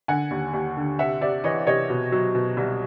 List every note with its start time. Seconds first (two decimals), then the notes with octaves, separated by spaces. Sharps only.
0.08 D3 F#5 G#5
0.31 D#2
0.54 D#2
0.77 D3
0.99 C3 E5 F#5
1.21 C3 D5 E5
1.44 E3 C#5 D#5
1.67 C3 C#5 D#5
1.90 B2
2.12 F#3
2.35 B2
2.57 C2